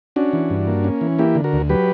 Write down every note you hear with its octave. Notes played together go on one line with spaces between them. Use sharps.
C#4 D4 F#4
E3
G2
A#3
C#4
E3
A#3 E4 G4
D3
F#4 A#4
D2
F#3 G4 B4